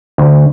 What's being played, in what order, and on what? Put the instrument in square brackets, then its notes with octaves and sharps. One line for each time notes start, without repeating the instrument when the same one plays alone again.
[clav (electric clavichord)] D2